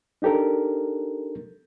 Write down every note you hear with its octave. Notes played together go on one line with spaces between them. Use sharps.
D4 D#4 G4 A4 A#4